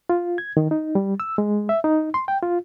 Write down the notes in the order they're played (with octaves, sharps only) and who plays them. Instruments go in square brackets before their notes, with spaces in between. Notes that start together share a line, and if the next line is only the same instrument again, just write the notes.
[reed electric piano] F4
G#6
D#3
D#4
G3
E6
G#3
E5
D#4
C6
G5
F4